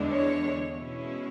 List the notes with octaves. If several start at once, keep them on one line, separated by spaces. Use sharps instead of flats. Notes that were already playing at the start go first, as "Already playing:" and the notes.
Already playing: E2 D3 G#3 D4
C#5
B2 G#3 C#4 E4